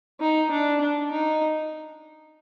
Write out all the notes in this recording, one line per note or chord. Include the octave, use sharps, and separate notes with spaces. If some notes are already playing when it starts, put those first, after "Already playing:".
D#4
D4
D4
D#4